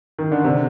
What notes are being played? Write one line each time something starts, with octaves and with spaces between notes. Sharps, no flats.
D#3
D3
C3